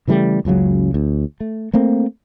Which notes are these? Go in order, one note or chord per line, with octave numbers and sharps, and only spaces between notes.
C#3 E3 G3 A3
F#1 C#2 C#3 F#3
D2
A3
A3 A#3 C4